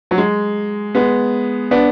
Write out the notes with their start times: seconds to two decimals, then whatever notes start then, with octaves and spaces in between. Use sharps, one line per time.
0.11 F#3
0.18 G#3
0.95 G#3 B3
1.71 B3 D4